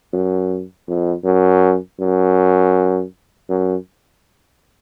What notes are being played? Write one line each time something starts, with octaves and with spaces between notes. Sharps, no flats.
F#2
F2
F#2
F#2
F#2